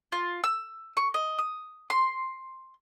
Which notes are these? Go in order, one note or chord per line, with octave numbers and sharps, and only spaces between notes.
F4
E6
C#6
D#5
D#6
C6